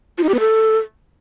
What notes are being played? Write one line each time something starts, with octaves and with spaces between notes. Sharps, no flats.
F4
D#4
G4
B3
A4